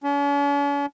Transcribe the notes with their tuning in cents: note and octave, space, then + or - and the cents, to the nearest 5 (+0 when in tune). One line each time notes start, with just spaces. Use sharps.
C#4 +45